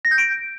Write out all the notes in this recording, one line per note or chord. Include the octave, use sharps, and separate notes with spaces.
A#6
G6
D7